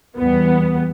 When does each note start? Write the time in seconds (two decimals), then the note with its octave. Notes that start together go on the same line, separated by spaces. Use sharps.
0.17 E2 G3 B3